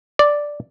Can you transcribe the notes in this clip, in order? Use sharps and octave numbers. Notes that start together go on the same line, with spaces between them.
D5